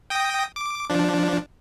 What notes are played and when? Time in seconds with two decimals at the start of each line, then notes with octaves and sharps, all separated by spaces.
0.10 G5 D#6 A#6
0.56 D6
0.90 F3 D4